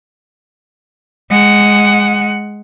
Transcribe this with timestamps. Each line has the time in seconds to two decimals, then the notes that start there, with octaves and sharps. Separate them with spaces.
1.30 G#3 F#5